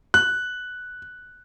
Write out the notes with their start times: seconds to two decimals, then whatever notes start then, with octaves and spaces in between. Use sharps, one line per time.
0.14 F#6